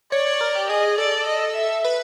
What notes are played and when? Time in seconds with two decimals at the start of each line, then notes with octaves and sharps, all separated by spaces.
0.12 C#5 D5
0.27 C#5
0.41 A#4
0.55 G4
0.69 G#4 D#5
0.98 A4 D5
1.27 D#5
1.56 E5
1.84 B4